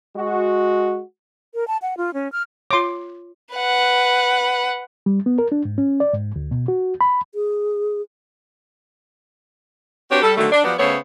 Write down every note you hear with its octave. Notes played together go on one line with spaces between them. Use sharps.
G#3 F#4
A#4
A5
F#5
F4
C#4
F6
F4 C#5 C6 D6
B4 F#5
G3
B3
A#4
D4
G#2
C#4
D5
G#2
D2
B2
F#4
B5
G#4
C4 D4 F#4 G4 B4 C#5
G3 A4
D3 D#3 F#3 A3
D4
F3 F#3 B3 G4 D5 F#5
C#3 A3 B3 C5 C#5